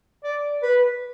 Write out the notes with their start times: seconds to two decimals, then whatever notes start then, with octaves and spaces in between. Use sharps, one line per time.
0.24 D5
0.63 B4